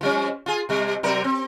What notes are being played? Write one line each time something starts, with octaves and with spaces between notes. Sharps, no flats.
F3 G3 C#4
F4 G#4
C3 G3
C3 F#3 A#4
C4